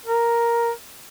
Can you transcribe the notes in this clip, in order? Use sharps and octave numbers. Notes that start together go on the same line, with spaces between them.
A#4